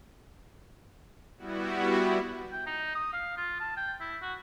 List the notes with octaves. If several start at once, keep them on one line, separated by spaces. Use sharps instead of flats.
G3 B3 E4 F#4
G5
D#4
D#6
F5
F4
A5
G5
E4
F#4